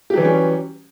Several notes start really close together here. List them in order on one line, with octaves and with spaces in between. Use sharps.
G4 F#3 E3 G3 C#4